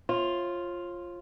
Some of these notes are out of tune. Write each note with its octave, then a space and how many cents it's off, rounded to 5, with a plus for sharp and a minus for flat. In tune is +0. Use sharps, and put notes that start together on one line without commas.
F4 +0 C#5 -40